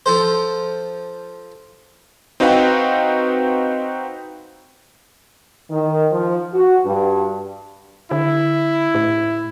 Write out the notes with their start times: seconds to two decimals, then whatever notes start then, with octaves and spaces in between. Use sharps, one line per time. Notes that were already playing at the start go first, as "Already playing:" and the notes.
0.06 F3 A4 C5
2.40 C4 D#4 F#4 B4 F5 G5
5.71 D#3
6.12 F3
6.54 F#4
6.86 G2
8.11 D3 E4
8.95 A2